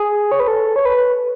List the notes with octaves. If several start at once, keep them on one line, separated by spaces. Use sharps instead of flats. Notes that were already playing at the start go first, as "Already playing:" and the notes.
Already playing: G#4
C#5
B4
A4
C#5
B4